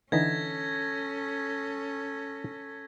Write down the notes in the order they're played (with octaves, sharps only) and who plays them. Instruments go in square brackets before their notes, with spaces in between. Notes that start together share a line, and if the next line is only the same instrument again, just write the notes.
[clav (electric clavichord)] D3 E3 D#4 [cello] C#4 A4 [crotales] G#6 A#6 B6